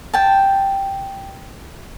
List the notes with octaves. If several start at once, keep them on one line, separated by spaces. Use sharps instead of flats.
G5 A5